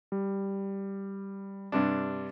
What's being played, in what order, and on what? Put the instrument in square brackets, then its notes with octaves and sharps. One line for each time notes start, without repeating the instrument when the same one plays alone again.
[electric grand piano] G3
[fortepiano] G2 C3 D4